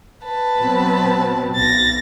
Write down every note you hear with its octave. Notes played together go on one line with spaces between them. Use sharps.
B4 A5
B2 F#3 C4
B1 A6 A#6